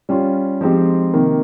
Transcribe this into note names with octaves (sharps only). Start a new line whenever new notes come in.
G3 C#4 F4
F3 G#3 C4 D#4 G4
C3 D#3 A#3